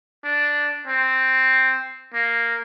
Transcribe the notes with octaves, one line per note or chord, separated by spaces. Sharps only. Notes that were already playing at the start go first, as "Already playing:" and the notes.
D4
C4
A#3